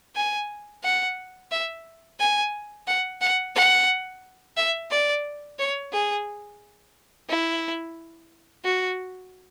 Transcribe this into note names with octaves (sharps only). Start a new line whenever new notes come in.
G#5
F#5
E5
G#5
F#5
F#5
F#5
E5
D5
C#5
G#4
E4
F#4